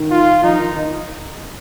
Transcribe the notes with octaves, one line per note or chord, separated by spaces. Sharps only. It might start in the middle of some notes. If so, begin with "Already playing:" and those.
Already playing: D#3
F4
F3 D#4
D#3
D#3